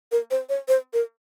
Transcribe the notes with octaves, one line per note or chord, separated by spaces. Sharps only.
A#4
C5
C#5
C5
A#4